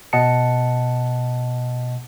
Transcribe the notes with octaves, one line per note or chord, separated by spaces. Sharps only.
B2 D#5 F#5 A5 C#7